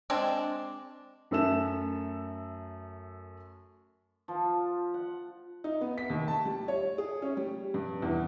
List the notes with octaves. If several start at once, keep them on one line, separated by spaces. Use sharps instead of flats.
G#3 C4 D4
F#2 A3 A4 E5 E6 E7
F3
F#5
D#4
B3
B6
D#2
A5
G3
C#5
G#4
C#4
G3
G2
E2